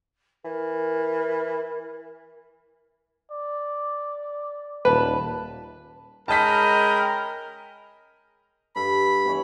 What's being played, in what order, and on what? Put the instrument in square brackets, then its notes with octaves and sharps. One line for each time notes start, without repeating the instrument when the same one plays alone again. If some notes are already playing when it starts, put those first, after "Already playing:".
[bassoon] E3 [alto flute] A#4
[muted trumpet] D5
[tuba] D#1 [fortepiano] B4 [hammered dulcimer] A5 B5
[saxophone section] G#3 C#4 D#5 [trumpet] A#4 [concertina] G5 B5 [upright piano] A5 B6
[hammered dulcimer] G2 A4 [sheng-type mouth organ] B5
[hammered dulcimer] B2 E3 C#5